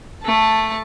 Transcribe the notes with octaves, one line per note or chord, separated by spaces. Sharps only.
A3 A5